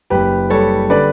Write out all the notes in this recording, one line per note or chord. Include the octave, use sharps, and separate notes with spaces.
F#1 G4 B4
G3 A4 C#5
D3 B4 D5